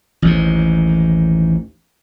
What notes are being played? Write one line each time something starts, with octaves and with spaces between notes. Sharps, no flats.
A1 D#2 G#2